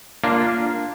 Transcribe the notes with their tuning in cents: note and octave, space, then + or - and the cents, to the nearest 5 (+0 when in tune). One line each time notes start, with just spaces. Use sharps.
A#3 +0 D4 +0 F4 -10